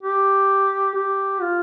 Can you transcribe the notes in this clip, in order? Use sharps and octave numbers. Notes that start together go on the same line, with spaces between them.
G4
G4
F4